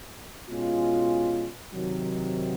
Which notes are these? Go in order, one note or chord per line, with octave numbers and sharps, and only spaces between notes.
B2 G#3 C#4 F4
C3 D#3 F#3